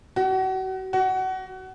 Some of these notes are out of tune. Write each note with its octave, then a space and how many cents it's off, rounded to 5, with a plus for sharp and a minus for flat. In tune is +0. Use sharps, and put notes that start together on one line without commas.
F#4 +35
F#4 +25